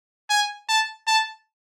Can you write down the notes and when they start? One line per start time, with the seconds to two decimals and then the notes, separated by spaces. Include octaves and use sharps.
0.30 G#5
0.69 A5
1.07 A5